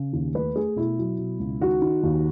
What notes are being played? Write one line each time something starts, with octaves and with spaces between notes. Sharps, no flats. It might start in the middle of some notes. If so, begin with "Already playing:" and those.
Already playing: C#3
D#2
A3 B4
A3 G#4
B2 E4
F#3
B2
C#2
D#3 F#4
D#3
D#2